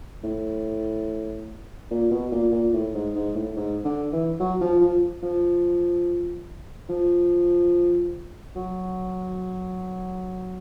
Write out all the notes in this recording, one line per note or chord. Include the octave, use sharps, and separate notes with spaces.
A2
A#2
B2
A#2
A#2
A2
G#2
G#2
A2
G#2
D3
E3
F#3
F3
F3
F3
F3
F#3